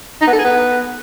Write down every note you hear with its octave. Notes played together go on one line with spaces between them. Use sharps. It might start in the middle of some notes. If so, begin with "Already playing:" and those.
D#4
B3
A4
G#4
B3